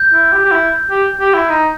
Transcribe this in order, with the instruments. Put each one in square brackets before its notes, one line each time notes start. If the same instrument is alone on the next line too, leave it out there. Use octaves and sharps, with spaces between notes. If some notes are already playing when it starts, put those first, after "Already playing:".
Already playing: [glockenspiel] G6
[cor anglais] E4
G4
G4
E4
G4
G4
E4
D#4